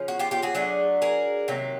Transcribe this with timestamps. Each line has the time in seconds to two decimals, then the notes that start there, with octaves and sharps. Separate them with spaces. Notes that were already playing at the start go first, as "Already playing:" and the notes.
Already playing: C#3 F3 C#4
0.08 F#4
0.19 F4 G4
0.31 F4 G4
0.42 F#4 G#4
0.55 F#3 A3 D4
1.02 G#4 A#4
1.48 C3 D#3 F#3 A#3